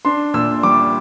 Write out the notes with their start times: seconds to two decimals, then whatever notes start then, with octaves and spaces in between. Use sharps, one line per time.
0.05 D4 C6
0.34 A#2 E6
0.63 G3 D6